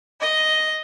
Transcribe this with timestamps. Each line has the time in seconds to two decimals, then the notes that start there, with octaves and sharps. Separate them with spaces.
0.20 D#5